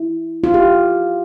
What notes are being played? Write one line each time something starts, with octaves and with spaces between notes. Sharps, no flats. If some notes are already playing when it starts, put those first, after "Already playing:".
Already playing: E4
F4
G4